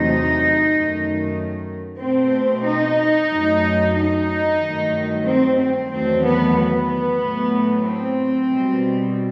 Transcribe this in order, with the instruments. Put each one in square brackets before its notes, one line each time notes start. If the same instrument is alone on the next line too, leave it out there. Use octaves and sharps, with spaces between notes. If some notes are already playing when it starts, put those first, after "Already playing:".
Already playing: [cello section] E2 C3 F#3 A3 D#4
F#2 D#3 A3
B2 A3 C4
D#4
F#2 F#3 A3
D#4
G2 D#3 F#3 A3
C4
C4
E2 D#3 F#3 A3 C4
B3
B3
A2 F#3 A3
C4
B2 G3